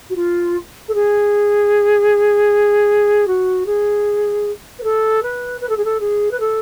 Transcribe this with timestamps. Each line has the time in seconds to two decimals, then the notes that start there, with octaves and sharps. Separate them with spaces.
0.09 F#4
0.15 F4
0.88 A4
0.94 G#4
3.27 F#4
3.66 G#4
4.78 B4
4.83 A4
5.22 B4
5.61 B4
5.69 A4
5.77 G#4
5.84 A4
6.00 G#4
6.31 B4
6.40 A4